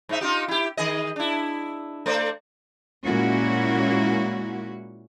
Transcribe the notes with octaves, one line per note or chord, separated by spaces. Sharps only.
G#2 D#4 E5
D#4 F4 G4
E4 G4
D#3 G#4 D#5
D4 E4
A3 C5 D5
A#2 G#3 A#3 C#4 E4 F#4